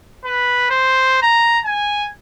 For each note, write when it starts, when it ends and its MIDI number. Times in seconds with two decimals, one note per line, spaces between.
0.25 0.69 71
0.70 1.18 72
1.22 1.59 82
1.65 2.08 80